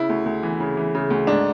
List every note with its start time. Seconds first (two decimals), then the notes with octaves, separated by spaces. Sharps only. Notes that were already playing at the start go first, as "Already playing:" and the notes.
Already playing: C#3 E4
0.09 D2
0.26 D2
0.43 E3
0.60 C#3
0.77 E3
0.95 C#3
1.10 D2
1.27 G#2 D4